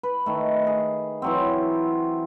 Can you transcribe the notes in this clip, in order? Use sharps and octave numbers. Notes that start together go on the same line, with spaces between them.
B4
D#3 A3
G#4
E3 F#3 C4